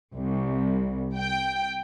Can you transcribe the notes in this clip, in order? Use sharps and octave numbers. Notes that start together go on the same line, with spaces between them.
C2
G5